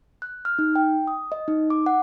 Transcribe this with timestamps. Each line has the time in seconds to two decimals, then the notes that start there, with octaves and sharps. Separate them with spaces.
0.22 F#6
0.45 F6
0.59 D#4
0.76 G5
1.07 D#6
1.32 D#5
1.48 D#4
1.70 D6
1.86 F#5